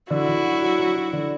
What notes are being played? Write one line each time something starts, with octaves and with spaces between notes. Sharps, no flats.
D3 E4 F#4
D3
F#3
F#3
F#3
F#3
D3